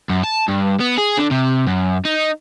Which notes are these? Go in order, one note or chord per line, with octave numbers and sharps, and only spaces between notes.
F#2
A5
G2
B3
G#4
D3
C3
F#2
D#4